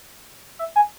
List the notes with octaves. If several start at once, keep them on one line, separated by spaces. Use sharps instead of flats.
E5
G#5